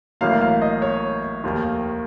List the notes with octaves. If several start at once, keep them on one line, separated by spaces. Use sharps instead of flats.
A1 A2 F#3 A#3 F5
F5
D#5
C#5
F1 D#2 D#3 A#3